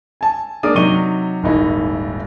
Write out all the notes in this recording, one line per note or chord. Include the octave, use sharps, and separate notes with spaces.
G#5 A5
G#3 A#3 D4 A#4 D5 D#6
C3 F#3 D#4 C#6 D#7 G7
D#1 G#1 D#4 E4